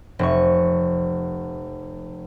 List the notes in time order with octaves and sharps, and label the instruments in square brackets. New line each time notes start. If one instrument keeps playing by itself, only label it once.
[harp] F1 C#6